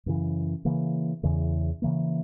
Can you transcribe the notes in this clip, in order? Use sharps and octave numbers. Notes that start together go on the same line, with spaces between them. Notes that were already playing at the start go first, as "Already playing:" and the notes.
F#2 C#3 E3
C#3 E3 A#3
E2 C#3 E3
C#3 E3 A#3